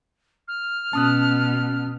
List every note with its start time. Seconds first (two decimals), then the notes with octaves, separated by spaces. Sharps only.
0.48 F6
0.93 B2 C#4 A5 D#6 F#6